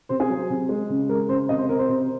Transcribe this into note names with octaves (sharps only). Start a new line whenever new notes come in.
C3 C5
G#4
F#3
C3
G#3
C#3
G#3 A#4
C#3 C5
C3 D#5
C5
C3 A#4
C5
C3